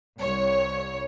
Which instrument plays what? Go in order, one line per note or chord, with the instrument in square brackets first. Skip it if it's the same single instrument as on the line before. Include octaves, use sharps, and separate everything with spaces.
[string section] C2 C#5